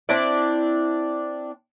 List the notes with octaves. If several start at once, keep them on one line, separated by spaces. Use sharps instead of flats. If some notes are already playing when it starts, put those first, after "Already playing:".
C4 D4 E4 D5